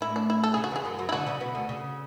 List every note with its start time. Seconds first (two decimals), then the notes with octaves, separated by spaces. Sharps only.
0.01 A2 A3 E4
0.16 D4
0.30 E4
0.44 A4
0.54 C#3 C#4 G#4
0.64 F#4
0.71 E2 E3 G#4
0.85 F#2 F#3
0.99 F#2 F#3
1.09 E4
1.12 D3 D4 F#4
1.27 C#3 C#4
1.40 B2 B3
1.55 D2 D3
1.69 C#3